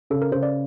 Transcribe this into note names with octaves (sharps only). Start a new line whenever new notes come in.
C#3 A4
A#4
C#3 C5
D5